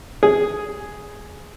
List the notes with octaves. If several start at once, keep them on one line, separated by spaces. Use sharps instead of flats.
G#4